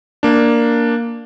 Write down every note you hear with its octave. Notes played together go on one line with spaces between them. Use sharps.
A#3 D4